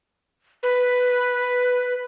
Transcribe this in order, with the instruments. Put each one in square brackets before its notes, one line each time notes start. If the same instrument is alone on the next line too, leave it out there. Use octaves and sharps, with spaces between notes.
[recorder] B4